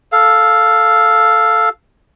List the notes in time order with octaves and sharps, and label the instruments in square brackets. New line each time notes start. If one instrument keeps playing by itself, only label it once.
[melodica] A4 F5